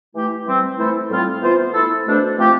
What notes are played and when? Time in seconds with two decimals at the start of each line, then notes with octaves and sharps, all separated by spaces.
0.15 E3 A3 E4 G4
0.46 E3 G3 C4
0.78 E3 A3 E4 A4 C5
1.10 A2 G3 C4 F4
1.42 E3 B3 F4 C5
1.74 A3 E4 A4
2.06 B2 A3 D4 A4 C5
2.38 F3 A3 C4 G4